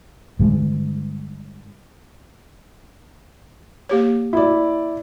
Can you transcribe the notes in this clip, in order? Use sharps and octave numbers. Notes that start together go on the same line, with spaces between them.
G2 D3 G#3
A#3 G4 C#5
E4 D5